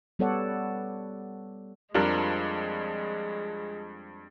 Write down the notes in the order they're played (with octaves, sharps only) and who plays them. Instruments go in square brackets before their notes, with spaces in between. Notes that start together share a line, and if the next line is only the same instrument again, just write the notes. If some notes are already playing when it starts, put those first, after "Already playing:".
[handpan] G3 B3 A4 C#5 D5 F#5
[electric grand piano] F2 D4 [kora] F3 G3 A#4 [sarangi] G#3